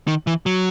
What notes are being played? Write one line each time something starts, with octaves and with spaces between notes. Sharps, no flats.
D#3
E3
F#3